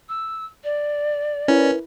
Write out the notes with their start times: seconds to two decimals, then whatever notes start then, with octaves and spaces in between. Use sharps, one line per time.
0.09 E6
0.64 D5
1.48 C#4 E4 A#4 B4